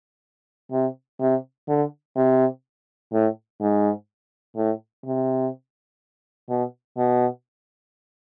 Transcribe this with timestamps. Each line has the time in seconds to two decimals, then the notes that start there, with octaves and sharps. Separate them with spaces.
0.72 C3
1.20 C3
1.68 D3
2.16 C3
3.12 A2
3.61 G#2
4.56 A2
5.05 C3
6.49 B2
6.97 B2